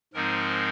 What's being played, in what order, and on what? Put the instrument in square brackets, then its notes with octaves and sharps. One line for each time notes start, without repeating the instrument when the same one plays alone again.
[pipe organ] G#2 F3 G#3 C4 D#4 A#4